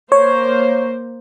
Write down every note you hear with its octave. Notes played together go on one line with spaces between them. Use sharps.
A#3 C5 C#5